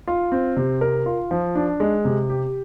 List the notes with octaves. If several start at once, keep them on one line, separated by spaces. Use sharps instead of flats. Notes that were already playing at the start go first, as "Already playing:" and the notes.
F4
C4
C3
A#4
F4
F3
D4
G#3
C3
G4